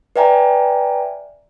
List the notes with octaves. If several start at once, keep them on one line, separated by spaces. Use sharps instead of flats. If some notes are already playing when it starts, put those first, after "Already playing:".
B4 D5 E5 G5 G#5 A#5